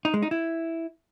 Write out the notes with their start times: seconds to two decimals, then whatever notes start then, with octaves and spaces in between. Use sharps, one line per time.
0.05 D#4
0.14 G#3
0.22 D#4
0.31 E4